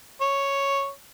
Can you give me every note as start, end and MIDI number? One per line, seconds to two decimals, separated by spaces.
0.21 0.89 73